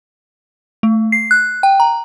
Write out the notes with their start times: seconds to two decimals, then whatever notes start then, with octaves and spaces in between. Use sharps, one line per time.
0.83 A3
1.12 C7
1.31 F#6
1.63 G5
1.80 A#5